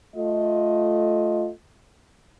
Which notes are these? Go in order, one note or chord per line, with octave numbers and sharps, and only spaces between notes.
A3 F4 D#5